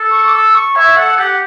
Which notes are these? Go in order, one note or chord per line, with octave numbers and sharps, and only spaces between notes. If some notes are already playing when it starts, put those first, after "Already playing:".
Already playing: A4
C#6
D6
E6
C#6
C#5 E5
A4 F#5
G4 F#5